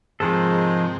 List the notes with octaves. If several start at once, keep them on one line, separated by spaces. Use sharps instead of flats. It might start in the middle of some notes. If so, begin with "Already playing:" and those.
G#2 C3 D#3 F3 G#3 A4